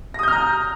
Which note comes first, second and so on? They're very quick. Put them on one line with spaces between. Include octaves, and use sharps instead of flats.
A#6 D#6 G6 F6 A#5